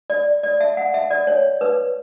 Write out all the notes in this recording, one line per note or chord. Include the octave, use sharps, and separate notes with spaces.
D5
D5
E5
F#5
E5
D5
C#5
B4